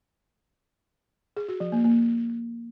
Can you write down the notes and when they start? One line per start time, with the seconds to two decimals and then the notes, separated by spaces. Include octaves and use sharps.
1.37 G#4
1.48 F#4
1.60 F3
1.72 A#3
1.84 A#3